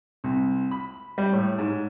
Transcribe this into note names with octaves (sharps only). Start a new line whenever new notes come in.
C2
B5
G3
A2
G#2